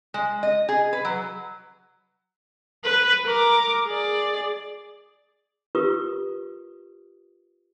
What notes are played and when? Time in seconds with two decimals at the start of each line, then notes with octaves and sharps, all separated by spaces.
0.14 G#3
0.43 D#5
0.69 G#4
0.93 B4
1.05 F#3
2.84 B4
3.26 A#4 D6
3.86 G#4 D5
5.75 F4 G4 A#4 B4 C#6 D#6